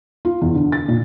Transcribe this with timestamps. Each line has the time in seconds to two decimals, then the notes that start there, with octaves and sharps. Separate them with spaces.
0.25 F4
0.41 E2
0.55 D3
0.72 A6
0.88 A#2